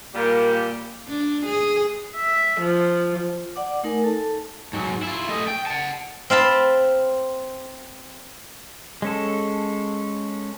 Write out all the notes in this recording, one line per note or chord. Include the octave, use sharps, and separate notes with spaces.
A#2 G3 A#3 G4
D4
G#4
E5
F3
D5 F#5 D6
A3 D#4 A#4 G#5
A4 A5
G#2 F#3
E4 F4
A3 D#5
G5
F#5 A5
C4 F5 A5 B5
G#3 C#4 A4